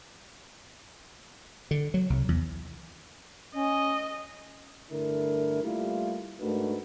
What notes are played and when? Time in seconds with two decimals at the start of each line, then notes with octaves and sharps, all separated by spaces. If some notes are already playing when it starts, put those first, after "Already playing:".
1.71 D3
1.94 F#3
2.10 C2
2.28 E2
3.55 C#4 D#5
4.91 G2 D3 A3 E4 A#4
5.63 G3 A3 A#3 E4 F4 G4
6.41 G#2 A3 D4 F#4 A#4 B4